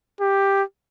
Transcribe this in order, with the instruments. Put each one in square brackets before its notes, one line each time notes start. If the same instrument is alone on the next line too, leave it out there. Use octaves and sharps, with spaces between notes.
[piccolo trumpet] G4